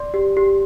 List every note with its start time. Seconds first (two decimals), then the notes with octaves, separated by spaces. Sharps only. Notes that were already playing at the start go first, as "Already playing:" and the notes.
Already playing: D5 C6
0.14 G4
0.37 G4